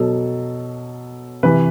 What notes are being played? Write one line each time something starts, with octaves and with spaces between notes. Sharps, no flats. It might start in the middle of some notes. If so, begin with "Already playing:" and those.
Already playing: B2 F#3 A4
C3 E3 B4